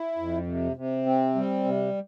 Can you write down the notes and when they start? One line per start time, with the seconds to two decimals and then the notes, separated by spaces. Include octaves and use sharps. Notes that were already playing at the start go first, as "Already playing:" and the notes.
Already playing: E4
0.18 F2
0.47 C3
0.76 C3
1.06 C4
1.35 G3
1.63 C3